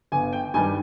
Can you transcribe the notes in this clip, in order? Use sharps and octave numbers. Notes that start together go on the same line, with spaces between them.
G1 G#5
G5
G2 D#3 G3 G#5